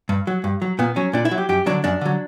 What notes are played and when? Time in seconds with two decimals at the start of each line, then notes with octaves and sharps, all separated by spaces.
0.09 G2
0.27 F#3
0.44 G2
0.62 F#3
0.79 A#2 B3
0.96 F#3 C#4
1.13 A#2 D4
1.25 E4
1.31 F#3
1.38 G4
1.49 F#2 G4
1.66 D3 F#3 D4
1.84 F#2 D4
2.01 D3 F#3